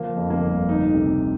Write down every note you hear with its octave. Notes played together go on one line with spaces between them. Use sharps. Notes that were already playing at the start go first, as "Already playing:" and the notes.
Already playing: F3 A#3
F2
A#3
G1
D2 D#4
C3